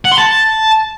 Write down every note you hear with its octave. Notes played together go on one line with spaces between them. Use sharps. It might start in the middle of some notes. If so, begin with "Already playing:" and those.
F#5
C6
A5